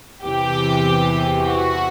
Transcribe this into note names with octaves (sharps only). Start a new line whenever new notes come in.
E2 C3 E3 G4
F#4